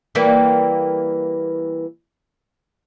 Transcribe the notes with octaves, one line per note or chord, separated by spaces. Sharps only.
E3 G3 A#3